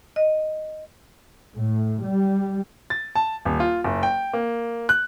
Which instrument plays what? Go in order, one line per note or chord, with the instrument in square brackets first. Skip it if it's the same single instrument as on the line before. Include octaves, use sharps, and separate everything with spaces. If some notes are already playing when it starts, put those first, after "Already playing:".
[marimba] D#5
[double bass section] A2
G3
[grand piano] A6
A5
D#1
F4
F#1
G5
A#3
F#6